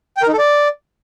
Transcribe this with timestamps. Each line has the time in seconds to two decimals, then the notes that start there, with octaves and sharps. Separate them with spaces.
0.17 G5
0.22 A#4
0.28 D#4
0.33 A4
0.39 D5